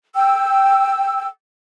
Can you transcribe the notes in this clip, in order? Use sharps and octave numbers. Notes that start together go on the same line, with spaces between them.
G5 E6